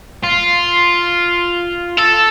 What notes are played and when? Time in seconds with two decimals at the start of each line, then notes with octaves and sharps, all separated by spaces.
0.24 F4
1.97 A4